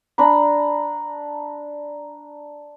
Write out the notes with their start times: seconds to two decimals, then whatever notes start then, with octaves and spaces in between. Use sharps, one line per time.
0.18 D4 A#5 B5